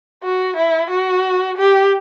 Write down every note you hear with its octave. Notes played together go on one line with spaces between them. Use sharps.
F#4
E4
F#4
G4